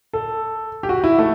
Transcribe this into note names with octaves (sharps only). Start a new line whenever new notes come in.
A4
G4
F#4
E4
A3